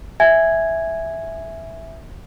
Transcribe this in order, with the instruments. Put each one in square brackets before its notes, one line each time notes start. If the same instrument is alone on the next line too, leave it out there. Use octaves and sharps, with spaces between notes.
[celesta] E5 G#5 G#6